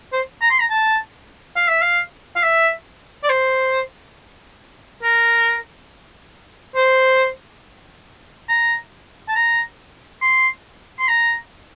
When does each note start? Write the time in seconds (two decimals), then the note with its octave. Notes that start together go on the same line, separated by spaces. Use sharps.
0.13 C5
0.41 A#5
0.50 C6
0.60 A#5
0.70 A5
1.56 F5
1.68 E5
1.82 F5
2.36 F5
2.43 E5
3.24 D5
3.29 C5
5.03 A#4
6.76 C5
8.49 A#5
9.29 A5
9.35 A#5
10.22 C6
11.00 C6
11.08 A#5